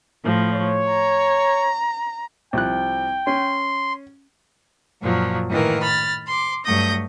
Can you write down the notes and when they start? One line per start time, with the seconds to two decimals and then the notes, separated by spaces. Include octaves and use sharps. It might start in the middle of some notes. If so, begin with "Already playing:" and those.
0.24 A2 F3
0.54 C#5
0.88 A#5
2.53 C2 F3 G5 F#6
3.27 C#4 C6
5.02 F#2 A#2 F3 F#3
5.49 A2 D#3 E3 A#3 A#4
5.81 B5 F6 A6
6.26 C6 D6
6.64 G2 F#3 A3 D#6 G6 A#6